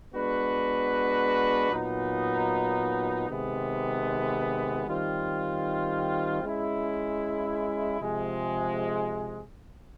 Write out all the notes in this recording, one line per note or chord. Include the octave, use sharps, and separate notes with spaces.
G#3 B3 D4 F#4 B4
A#2 F#3 B3 D#4
C3 D#3 G#3 B3
D#3 G3 C4 F4
G#3 C#4 E4
C3 F3 G#3